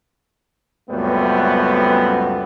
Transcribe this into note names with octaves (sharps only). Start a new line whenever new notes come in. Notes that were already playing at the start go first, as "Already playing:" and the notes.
C#2 F#2 G3 A3 B3 C4